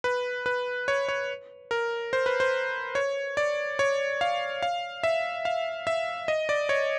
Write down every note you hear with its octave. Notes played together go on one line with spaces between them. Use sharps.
B4
B4
C#5
C#5
A#4
C5
B4
C5
C#5
D5
C#5
F5
F5
E5
F5
E5
D#5
D5
C#5